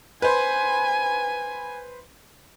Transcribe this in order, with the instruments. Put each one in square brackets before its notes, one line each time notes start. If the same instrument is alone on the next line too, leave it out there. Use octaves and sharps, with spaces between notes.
[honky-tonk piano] B4 C5 [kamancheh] G#5